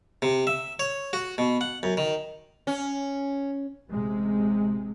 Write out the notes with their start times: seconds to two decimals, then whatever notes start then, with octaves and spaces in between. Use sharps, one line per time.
0.22 C3
0.47 E5
0.79 C#5
1.13 F#4
1.38 B2
1.61 F#5
1.83 F#2
1.97 D#3
2.67 C#4
3.88 A1 C3 G#3